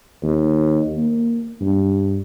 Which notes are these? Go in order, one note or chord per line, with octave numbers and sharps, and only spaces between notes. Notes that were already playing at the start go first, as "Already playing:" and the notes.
D#2
A#3
G2